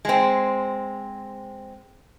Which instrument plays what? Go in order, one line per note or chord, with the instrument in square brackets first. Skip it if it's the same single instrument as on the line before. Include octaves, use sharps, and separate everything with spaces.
[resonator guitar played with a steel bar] G#3 C4